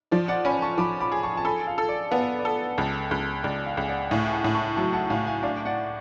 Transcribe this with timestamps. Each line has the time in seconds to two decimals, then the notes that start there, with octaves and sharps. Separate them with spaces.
0.11 F3 D5
0.28 D5 F#5
0.45 C#4 G#5 B5
0.62 A5 C#6
0.78 F3 B5 D6
1.01 B5 D6
1.12 G#4
1.23 A5 C#6
1.37 A5
1.45 A4 G#5 B5
1.67 F5
1.78 A4
1.89 D5
2.11 B3 F5
2.20 D5
2.39 D5
2.45 A4
2.78 C#2
3.11 C#2
3.44 C#2 D5
3.66 F5
3.77 C#2 G#5
3.88 D5 F#5
4.11 A2 F5 G#5
4.27 G#5
4.32 F#5 A5
4.44 A2
4.55 A5 C#6
4.76 F#3 A5 C#6
4.93 F#5 A5
5.10 A2 F5 G#5
5.26 F5 G#5
5.43 D4 F5 G#5
5.65 D5 F#5